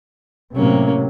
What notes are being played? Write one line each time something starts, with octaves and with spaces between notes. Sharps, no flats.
A2 C3 F#3 A#3 C#4